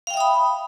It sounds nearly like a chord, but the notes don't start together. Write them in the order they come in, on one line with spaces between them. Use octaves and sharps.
F5 G5 E5 D#6 B5